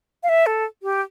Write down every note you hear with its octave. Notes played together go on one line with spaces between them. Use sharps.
F5
E5
A4
G4